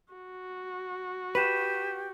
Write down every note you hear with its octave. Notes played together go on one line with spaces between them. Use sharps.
F#4
G4 B4 B6 D#7 E7